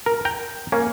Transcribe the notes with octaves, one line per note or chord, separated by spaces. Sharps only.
A#4
G5 A#5
A#3 C#4